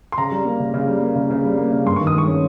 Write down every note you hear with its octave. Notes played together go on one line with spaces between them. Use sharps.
C6
C#3 A#5
G3
A#3
C#3
C#3
G3
A#3
C#3
C#3
G3
A#3
C#3
G2 C6
C#6
D#3
D#6
G#3 C#6
C#4